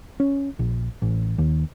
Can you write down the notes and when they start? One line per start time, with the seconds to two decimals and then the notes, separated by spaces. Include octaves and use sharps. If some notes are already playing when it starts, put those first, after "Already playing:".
0.20 C#4
0.59 A#1
1.02 A1
1.38 D#2